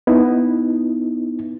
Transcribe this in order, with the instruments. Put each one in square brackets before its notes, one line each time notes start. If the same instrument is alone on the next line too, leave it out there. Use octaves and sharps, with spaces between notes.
[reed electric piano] B3 D#4 E4